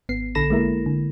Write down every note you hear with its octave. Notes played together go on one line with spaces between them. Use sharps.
G#1 B3 C7
A#1 D3 A4 B5 A#6 E7
G#3 A#3 E4 A#4
D3